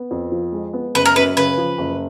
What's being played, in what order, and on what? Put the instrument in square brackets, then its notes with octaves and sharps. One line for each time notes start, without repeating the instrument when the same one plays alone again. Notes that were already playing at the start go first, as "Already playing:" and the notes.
Already playing: [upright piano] B3
F2
F3
G#3
B3
[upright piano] F#1 [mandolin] B4
[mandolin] A#4
[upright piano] F#2 [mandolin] B4
[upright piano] C#3 [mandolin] B4
[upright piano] F3
F#1